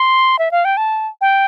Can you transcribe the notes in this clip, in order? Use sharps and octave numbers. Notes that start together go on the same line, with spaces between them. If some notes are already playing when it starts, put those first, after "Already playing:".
Already playing: C6
E5
F5
G5
A5
G5